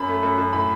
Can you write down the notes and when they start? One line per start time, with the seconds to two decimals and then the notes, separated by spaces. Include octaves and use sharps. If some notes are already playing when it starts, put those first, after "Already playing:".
Already playing: F#2 B5
0.08 A3
0.23 F#2
0.38 F#2
0.53 A2 B5